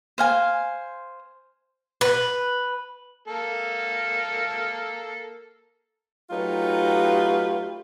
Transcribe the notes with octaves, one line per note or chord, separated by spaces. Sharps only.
C5 F5 G#5
B4
A#3 A4
F#3 A3 D#4 F4 G4 B4